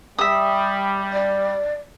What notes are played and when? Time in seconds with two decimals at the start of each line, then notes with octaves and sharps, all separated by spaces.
0.18 G3 E5 D#6
1.12 D5